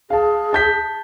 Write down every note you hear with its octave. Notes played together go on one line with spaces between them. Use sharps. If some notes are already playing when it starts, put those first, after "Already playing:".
G#4 F5 A5
A5 G6 B6